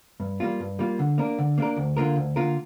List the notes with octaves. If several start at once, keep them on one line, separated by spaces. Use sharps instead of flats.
G2
G3 A#3 F4
G2
G3 A#3 F4
D3
A#3 D4 A#4
D3
A#3 D4 A#4
D2
D3 A#3 F4 A#4
D2
D3 A#3 F4 A#4